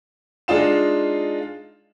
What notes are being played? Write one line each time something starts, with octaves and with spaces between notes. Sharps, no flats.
G#3 D4 D#4 F4 E7